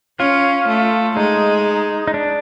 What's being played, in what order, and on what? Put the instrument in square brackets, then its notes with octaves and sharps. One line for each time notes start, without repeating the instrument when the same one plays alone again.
[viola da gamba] C#4 [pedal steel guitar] F4
[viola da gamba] A3
[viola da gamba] G#3 [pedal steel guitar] D#4
[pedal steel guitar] D#4
D4